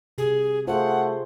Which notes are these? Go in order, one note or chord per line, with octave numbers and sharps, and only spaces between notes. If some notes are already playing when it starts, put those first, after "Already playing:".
C3 G#4
A3 F4 G#4 C5 F#5